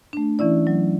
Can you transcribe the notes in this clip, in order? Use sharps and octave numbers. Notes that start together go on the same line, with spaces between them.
A3 D4
E3 C#4 E4 D5
F#3